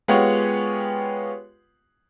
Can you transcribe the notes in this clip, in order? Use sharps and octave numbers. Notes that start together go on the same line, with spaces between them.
G#3 B3 F4 G4 C#5 F#5